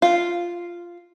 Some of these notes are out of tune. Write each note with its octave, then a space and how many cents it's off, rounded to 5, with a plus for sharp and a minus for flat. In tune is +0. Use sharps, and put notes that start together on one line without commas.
F4 -5